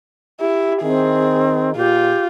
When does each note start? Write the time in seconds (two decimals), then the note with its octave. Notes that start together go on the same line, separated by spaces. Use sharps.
0.40 E4 G4
0.82 D#3 C4 G#4
1.77 A#2 F4 G4